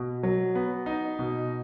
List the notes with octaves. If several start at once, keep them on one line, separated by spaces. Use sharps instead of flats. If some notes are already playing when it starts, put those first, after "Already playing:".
Already playing: B2
F#3
B3
D#4
B2